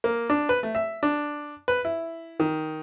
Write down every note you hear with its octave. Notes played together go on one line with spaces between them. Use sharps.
A#3
D4
B4
A3
E5
D4
B4
E4
D#3